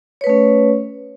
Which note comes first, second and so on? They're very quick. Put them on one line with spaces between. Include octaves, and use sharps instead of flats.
C#5 B4 A3 C#4